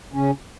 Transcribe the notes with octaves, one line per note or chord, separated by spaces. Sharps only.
C#3 C#4